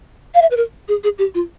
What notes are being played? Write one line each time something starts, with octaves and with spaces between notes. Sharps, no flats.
F5
E5
B4
A#4
G#4
G#4
G4
F4